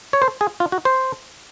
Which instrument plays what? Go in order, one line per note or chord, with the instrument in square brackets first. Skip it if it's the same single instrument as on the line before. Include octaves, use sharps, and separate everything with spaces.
[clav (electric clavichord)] C#5
C5
G#4
F4
F#4
C5